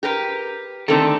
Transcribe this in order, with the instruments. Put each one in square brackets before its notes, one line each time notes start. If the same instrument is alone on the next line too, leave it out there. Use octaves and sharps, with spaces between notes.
[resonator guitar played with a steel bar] G4 A#4 B4
[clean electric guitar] D3 D#3 [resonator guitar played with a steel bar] A3 C4 A4